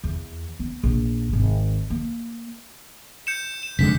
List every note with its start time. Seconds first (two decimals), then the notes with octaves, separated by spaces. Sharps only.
0.04 E2
0.59 B3
0.84 A#1
1.33 G#1
1.90 A#3
3.27 G6 C#7 E7
3.63 E7
3.79 F1 D3 G#3 B6